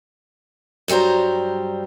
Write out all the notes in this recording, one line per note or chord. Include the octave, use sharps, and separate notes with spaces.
G2 F#3 G3 C5 A#5